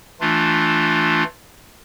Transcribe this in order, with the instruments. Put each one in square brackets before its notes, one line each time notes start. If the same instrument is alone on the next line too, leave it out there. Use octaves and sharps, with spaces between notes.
[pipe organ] E3 A3 D4 F4